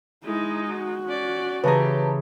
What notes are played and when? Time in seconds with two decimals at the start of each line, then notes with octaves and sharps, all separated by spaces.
0.24 G#3 D#4 E4
0.69 F#4
1.05 C#4 D5
1.64 C#3 E3 G4 G#4 B4 A5 A#5